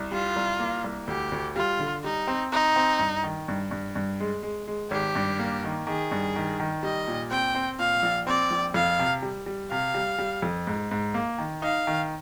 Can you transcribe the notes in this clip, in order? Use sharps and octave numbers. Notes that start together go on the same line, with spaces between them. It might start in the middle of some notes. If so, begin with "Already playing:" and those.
Already playing: C2
G3 F4
C2
A#3
C2
D2 G4
D2
G3 F4
D3
G3 D#4
C4
C4 D#4
C4
G2
D#3
G2
G2
G2
G#3
G#3
G#3
G#1 G4
G2
A#3
D#3
D#3 G#4
G2
D#3
D#3
G3 D#5
A#2
C4 G5
C4
A#2 F5
A#1
C4 D5
A#1
F2 F5
C3
G3
G3
C3 F5
G3
G3
F2
G#2
G#2
A#3
D#3
D#4 F5
D#3